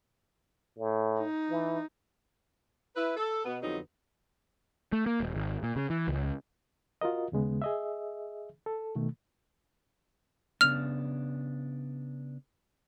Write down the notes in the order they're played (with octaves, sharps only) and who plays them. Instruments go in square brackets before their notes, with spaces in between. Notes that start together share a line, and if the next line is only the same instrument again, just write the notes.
[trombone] A2
[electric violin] D#4
[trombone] E3
[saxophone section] E4 B4
A4
B2 B3
F2 D3 F#3 G3 B3 D#4
[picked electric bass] A3
A#3
D#1
G#1
A#2
C#3
E3
C#2
[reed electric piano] F4 F#4 A#4 D#5
D#2 C#3 G#3 B3
G#4 D#5 E5
A4
B2 D#3 A3
[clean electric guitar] C#3 B3 D4 [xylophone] F6 F7